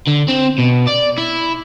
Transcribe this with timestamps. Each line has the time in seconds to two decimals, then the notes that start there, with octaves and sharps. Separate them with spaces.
0.08 D3
0.29 C4
0.59 B2
0.88 D5
1.18 E4